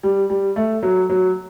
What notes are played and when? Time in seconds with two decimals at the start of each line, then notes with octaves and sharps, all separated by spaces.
0.03 G3
0.30 G3
0.56 A3
0.83 F#3
1.10 F#3